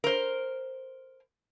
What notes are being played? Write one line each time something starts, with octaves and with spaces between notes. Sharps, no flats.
A#4 C5